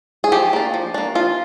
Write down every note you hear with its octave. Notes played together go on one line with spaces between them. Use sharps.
G#4
F3 G4
A#3 D4
F3
A#3 D4
F3 F4